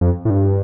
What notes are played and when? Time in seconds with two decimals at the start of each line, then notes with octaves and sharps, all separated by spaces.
0.01 F2
0.25 A2
0.30 G2